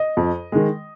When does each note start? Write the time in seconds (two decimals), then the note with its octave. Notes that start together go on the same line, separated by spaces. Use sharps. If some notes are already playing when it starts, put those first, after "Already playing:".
Already playing: D#5
0.17 F2
0.52 D#3 G#3